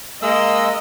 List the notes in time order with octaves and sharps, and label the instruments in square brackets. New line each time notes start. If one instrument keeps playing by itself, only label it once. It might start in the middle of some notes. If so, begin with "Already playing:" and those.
[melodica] G#3 E6 [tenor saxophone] A#3 [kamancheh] D#5